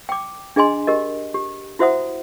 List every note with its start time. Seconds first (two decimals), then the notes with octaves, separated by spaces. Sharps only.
0.09 G5 D6
0.56 D4 G#4 D#5 G#5 C6
0.87 G4 A#4 D#5
1.34 G4
1.79 E4 F#4 C5 E5 F#5 D#6